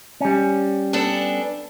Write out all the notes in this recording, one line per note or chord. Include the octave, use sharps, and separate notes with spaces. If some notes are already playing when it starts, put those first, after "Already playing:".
G3 C#4
B3 D4 A4